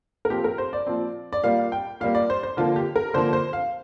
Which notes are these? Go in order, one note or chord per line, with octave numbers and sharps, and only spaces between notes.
A#4
A#2 F3 C4 G4
A#4
C5
D5
A#2 F3 C4
D5
A#2 G3 A#3 F5
G5
A#2 G3 A#3 F5
D5
C5
C5
D3 F3 A#3 F4
G4
A#4
D3 F3 A#3 C5
C5
F5